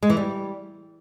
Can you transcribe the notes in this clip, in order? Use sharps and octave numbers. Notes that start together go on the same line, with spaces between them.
G#3
E3
G3